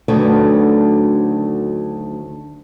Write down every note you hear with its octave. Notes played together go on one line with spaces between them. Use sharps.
D2 D3 D#3 F#3 A3 B4